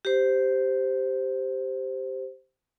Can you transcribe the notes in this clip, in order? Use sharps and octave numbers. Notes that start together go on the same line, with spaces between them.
G4 C5